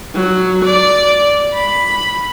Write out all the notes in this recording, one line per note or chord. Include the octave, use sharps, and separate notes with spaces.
F#3
D5
B5